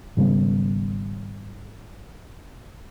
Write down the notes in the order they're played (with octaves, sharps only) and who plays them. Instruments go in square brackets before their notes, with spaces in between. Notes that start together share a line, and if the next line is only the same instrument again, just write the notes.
[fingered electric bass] G#1 C#3 G3 B3